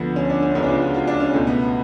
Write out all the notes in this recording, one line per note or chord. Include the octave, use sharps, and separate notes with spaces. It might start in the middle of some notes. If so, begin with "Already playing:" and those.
Already playing: D2 D3 F3 B3
C#4
D4
C#4
C#2 C#3 G#3 B3 C#4
D4
F4
F#4
F4
D4
C#4
C#2 B2 A3
B3